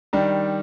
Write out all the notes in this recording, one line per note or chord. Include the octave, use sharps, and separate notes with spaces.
D#3 G3 D4